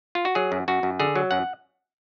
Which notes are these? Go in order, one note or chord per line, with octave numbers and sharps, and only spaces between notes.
F4
F#4
F#3 G#4
F#2
F#2 F#4
F#2
D3 G#4
F#3
F#2 F#5